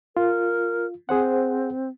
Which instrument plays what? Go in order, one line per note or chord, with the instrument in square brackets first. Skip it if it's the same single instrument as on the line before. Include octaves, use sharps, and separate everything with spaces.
[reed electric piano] F4 [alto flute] A#4
[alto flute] C4 [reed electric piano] G#4 C5 F#5